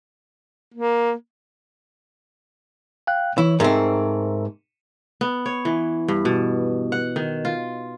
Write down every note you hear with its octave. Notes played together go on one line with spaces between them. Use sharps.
A#3
F5 G5 F#6
E3 E4 C#5
G#2 A3 C4 A#4 E5
B3
C#5
E3
G2
B2
F#5
D#3
F4